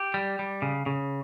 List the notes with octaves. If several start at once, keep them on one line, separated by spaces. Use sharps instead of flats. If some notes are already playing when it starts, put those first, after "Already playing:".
Already playing: G4
G3
G3
C#3
C#3